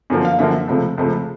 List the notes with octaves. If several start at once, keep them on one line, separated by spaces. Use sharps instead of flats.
F#2 D3 F3 A#3
F5
F#2 D3 F3 A#3 E5
C#2 C3 F3 A3
C#2 C3 F3 A3